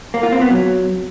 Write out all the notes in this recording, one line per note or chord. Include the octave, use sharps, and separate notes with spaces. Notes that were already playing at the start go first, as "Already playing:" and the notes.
A#3
F4
C4
B3
F#3